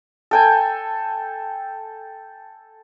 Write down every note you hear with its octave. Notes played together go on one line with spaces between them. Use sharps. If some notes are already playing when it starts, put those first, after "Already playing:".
A4 G5 G#5